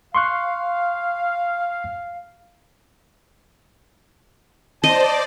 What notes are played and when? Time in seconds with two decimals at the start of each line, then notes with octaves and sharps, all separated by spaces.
0.15 F5 C6 C#6 F#6
4.84 C5 D5 D#5 A5